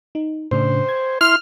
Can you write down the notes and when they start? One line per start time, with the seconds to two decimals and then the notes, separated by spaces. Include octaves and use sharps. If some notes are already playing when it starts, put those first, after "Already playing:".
0.15 D#4
0.51 A2 C#3 D4 C5
0.89 G#6
1.21 E4 C6 F6